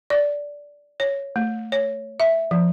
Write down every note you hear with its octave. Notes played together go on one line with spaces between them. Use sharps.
D5
C#5
A3
C#5
E5
F3